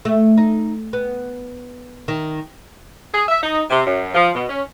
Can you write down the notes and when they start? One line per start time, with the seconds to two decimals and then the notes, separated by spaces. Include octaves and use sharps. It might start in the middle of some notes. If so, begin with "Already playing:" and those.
0.05 A3
0.37 D#4
0.93 B3
2.08 D#3
3.14 G#4
3.28 E5
3.43 D#4
3.70 C3
3.87 F#2
4.15 F3
4.35 B2
4.49 C#4